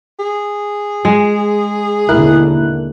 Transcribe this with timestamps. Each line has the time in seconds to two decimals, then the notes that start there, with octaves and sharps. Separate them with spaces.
0.19 G#4
1.05 G#3
2.09 D#2 B2 D3 E4 A#4 F#6